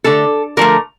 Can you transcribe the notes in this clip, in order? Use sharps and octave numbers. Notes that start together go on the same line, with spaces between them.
D3 A3 A4
D3 F3 A3 A#4